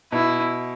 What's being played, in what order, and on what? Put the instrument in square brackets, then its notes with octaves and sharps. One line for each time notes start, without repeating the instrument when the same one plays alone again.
[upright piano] B2 [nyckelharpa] E4